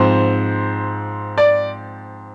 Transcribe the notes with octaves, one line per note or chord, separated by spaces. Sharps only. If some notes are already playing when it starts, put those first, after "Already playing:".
Already playing: G#2 F3 C4 C5
D5